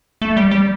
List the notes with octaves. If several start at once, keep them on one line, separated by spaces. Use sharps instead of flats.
A3
G3
G3